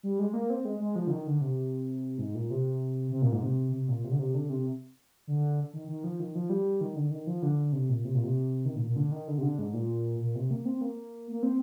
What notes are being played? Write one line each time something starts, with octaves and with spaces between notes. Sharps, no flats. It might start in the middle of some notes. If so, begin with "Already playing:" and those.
G3
G#3
A#3
C4
G#3
G#3
F3
D3
D#3
D3
C3
G#2
A#2
C3
C3
A#2
G#2
C3
C3
A#2
C3
D3
C3
D3
C3
D3
D#3
D#3
F3
D#3
F3
G3
D#3
D3
D#3
F3
D3
C3
A#2
C3
A#2
C3
D#3
A#2
A#2
D3
D#3
D3
C3
D3
G#2
A#2
A#2
C3
A#3
C4
A#3
A#3
C4